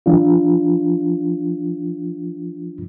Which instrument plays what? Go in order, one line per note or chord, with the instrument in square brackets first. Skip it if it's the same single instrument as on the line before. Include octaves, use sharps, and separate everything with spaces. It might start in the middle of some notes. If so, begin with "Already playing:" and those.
[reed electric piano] F3 D4 F4